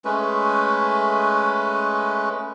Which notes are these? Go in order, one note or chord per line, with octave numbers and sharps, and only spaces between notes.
G#3 A3 C#4 B4